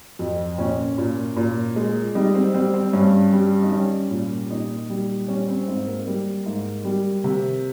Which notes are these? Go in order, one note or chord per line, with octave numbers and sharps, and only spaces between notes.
F2
A#2 C#4
A#2
A#2
G#3
G3 D#4
C4
G3 C4
C4
G2 C#4
G3
D#4
G3 C#4
A#2
A#2 D#4
G3
G3 C#4
C4
G#2 C4
A#3
G3
G#2
G3
C3